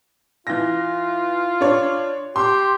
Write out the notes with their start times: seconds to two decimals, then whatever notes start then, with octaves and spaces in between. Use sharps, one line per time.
0.47 E3 F4 A#6
1.61 D4 C#5
2.36 G4 C6